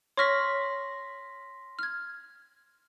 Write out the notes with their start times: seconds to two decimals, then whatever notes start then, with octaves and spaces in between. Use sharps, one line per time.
0.17 C#5 C6 C#6 F6 A#6 B6
1.79 F6 G#6